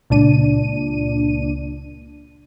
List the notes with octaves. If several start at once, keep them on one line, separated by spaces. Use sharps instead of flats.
C#2 A#2 D4 D#7